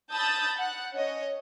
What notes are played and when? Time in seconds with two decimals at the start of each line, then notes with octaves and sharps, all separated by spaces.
0.13 A5 B5 D#6 E6 G6 A6
0.59 F#5 F#6
0.96 C#4 C#5 D#5